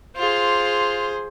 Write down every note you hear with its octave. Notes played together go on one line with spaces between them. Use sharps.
F4 G#4 C5